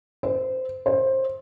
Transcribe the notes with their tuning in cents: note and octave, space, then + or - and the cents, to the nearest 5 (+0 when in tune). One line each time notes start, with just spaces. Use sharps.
C5 -20
C5 +20